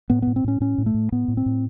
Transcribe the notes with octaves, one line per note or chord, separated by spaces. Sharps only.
A2 B3
A2 B3
C4
A2 C#4
A2 C#4
A2
A3
A2
A2 B3
A2
C4
A2